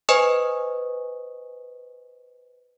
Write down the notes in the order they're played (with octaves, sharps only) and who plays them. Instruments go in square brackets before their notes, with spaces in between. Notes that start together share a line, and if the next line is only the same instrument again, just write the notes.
[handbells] B4 C5 D#5 G#5 C#6 D#6